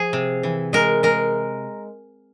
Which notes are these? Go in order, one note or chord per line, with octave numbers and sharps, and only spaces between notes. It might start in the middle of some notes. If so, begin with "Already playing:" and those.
Already playing: F3 G#4
C3
E3
G#3 A#4
G#3 A#4